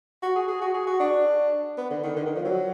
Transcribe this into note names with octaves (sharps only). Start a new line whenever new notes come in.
F#4
G#4
G#4
F#4
G#4
F#4
D4
B3
D3
D#3
D3
D#3
F3
F#3